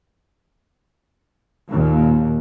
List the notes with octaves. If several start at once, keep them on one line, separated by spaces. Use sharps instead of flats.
D#2 A#2